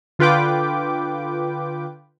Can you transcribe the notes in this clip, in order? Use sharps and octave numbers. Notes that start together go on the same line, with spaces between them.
D3 F4 B4 G5 D6